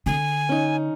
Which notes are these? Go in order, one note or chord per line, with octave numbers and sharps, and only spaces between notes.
D3 G#5
C#4 D#4